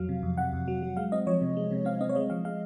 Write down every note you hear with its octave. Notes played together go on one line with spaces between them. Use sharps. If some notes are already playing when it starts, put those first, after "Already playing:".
Already playing: F2 F#3 F5
C3
F2
C3 F#5
F2
F#3
F#3
G#3 F5
C4 D#5
F3 C#5
C3
G#3
C3
C4 F5
C4 D#5
C#5
G#3 D#5
F3 F5
G#3 F5